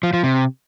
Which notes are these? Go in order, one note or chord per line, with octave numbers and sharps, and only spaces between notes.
F3
F3
C3